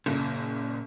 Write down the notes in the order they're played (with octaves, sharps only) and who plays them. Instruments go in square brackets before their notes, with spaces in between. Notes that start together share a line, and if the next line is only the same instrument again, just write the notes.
[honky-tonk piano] F#1 [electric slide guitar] A#2